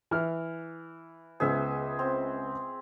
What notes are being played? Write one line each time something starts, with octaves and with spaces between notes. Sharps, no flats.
E3 F6
C#2 B3 G#4 C5 E5
C4